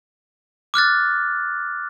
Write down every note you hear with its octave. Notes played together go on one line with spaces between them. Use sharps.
D6 F6 F#6 A6